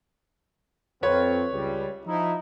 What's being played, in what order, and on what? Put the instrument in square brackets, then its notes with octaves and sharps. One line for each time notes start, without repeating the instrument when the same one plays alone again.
[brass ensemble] F2 C4 F4 [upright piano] B4 C#5
[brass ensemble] C#2 G3
F3 D#4 E4